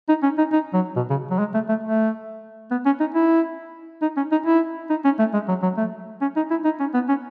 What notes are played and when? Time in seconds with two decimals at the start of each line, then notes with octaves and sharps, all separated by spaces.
0.09 D#4
0.23 C#4
0.38 D#4
0.52 D#4
0.73 F#3
0.96 B2
1.10 C#3
1.31 F#3
1.39 G#3
1.54 A3
1.69 A3
1.83 A3
2.71 B3
2.85 C#4
3.00 D#4
3.14 E4
4.02 D#4
4.17 C#4
4.32 D#4
4.46 E4
4.90 D#4
5.05 C#4
5.19 A3
5.34 G#3
5.48 F#3
5.63 F#3
5.77 A3
6.21 C#4
6.36 D#4
6.50 E4
6.65 D#4
6.80 C#4
6.94 B3
7.09 C#4